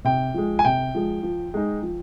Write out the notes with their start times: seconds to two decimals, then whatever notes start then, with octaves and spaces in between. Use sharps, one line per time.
0.05 C3 G5
0.34 F3 G#3
0.59 G#5
0.65 C3 G5
0.95 F3 G#3
1.23 F3
1.54 G#3 D#4
1.83 F3